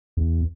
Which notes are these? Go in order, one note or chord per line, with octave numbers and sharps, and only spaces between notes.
E2